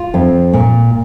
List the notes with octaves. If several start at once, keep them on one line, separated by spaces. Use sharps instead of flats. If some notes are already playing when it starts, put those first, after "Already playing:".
Already playing: F4
F2
A#2